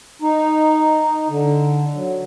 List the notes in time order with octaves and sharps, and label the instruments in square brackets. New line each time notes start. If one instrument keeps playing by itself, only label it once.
[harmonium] D#4
D3
F#3